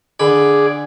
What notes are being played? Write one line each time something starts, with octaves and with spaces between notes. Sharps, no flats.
D3 G#4 D5 B5